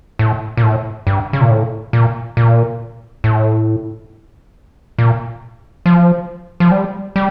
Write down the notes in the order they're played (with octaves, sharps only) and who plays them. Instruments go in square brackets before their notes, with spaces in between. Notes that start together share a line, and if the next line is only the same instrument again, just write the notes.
[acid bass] A2
A#2
A2
G2
C#3
A#2
A2
A#2
A#2
A2
A#2
F3
F3
G3
G3